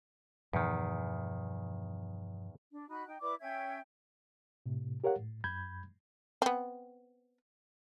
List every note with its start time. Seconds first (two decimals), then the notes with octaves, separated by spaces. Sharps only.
0.53 E2 G2 B2 D#3 F3
2.73 D4
2.89 D#4 F#4 B5 F#6
3.06 D#4 G5
3.20 E4 B4 D5 D6
3.40 C#4 E5 G5 G#6
4.66 A2 C3
5.04 G4 A#4 C#5 F5 F#5
5.19 A2
5.44 F#2 B5 G6 G#6
6.42 B3 C4